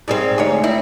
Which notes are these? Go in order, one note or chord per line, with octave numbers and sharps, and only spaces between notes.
G#2 G3 C4
D2 G#2 C#5
C4 E4